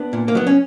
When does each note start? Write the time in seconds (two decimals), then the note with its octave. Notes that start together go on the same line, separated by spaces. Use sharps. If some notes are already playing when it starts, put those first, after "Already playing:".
Already playing: B3 D4
0.13 A#2
0.28 A#3
0.35 F#3 B3
0.47 C#4